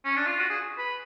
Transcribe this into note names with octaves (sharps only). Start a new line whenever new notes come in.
C#4
D4
F4
F#4
G#4
B4